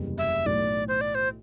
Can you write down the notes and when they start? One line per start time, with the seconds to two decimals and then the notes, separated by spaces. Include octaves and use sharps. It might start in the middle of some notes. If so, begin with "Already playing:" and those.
Already playing: F#1 E2 C3 G3
0.18 E5
0.45 B1 A2 E3 D5
0.88 C5
1.01 D5
1.15 C5